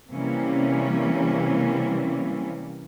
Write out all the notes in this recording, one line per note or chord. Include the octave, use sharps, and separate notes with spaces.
C3 E3 G3 A#3 C#4